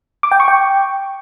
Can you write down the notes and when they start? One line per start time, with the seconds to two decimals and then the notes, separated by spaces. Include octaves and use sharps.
0.23 D6
0.31 G5
0.40 C#6
0.48 G5